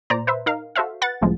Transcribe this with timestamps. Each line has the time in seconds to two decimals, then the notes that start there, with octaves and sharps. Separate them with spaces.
0.10 A#2 C5 D5 A#5
0.27 B4 C5 E5
0.46 D#4 A#4 F5
0.76 F#4 A4 C5 E5 F5
1.02 B4 F#5 A6
1.22 C2 A2 C#3 F3 G#3